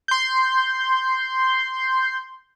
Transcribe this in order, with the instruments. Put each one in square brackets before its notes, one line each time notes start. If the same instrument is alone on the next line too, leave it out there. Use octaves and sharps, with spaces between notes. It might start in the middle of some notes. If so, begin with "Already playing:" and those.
[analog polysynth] C6 G6